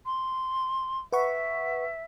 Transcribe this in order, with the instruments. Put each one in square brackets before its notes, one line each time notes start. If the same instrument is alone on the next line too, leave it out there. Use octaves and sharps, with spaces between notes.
[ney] C6
[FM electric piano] B4 F#5 C#6 [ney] E5